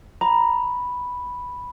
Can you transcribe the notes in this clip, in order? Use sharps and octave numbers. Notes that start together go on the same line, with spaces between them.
A#5 B5